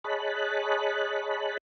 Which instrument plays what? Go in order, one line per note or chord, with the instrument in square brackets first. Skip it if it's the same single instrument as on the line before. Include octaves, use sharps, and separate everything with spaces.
[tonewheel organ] G#4 C#5 D#5 A5 B5 F#6